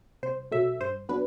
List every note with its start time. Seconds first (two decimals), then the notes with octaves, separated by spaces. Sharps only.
0.23 C2 C5
0.51 B2 F#3 A3 E5
0.80 G2 C5
1.09 F#3 B3 D4 B4